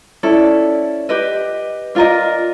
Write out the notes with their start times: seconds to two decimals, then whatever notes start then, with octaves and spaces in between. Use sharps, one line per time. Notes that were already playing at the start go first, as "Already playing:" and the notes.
0.23 C#4 E4 A4 D5
1.09 G4 B4 D#5
1.95 D4 F4 A#4 D#5